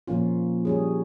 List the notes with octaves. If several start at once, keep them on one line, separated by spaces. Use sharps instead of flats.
A#2 F3 A#3 C#4 F4
G3 C#4 G#4